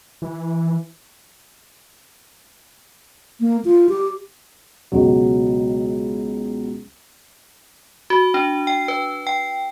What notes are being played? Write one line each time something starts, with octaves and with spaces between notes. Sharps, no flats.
E3
A#3
F4
G4
C#2 B2 F#3
F#4
D4
G5
B4
G5